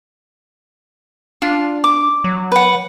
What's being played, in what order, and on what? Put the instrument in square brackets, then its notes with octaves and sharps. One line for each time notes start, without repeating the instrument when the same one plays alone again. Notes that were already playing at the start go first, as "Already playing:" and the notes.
[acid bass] D4 [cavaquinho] F4
[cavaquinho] D6
[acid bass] F#3
[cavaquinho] B4 F#5